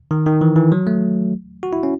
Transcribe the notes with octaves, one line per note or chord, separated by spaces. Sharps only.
D#3
D#3
E3
E3
F#3
A3
F#4
E4
C#4